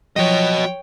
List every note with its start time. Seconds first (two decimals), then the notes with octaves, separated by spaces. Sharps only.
0.16 F3 F#3 F#4 C#5 D#5 G5